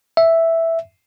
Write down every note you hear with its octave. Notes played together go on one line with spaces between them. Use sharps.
E5